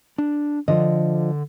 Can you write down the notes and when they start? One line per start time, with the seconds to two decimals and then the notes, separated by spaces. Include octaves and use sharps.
0.18 D4
0.68 D3 F3 D4 D#5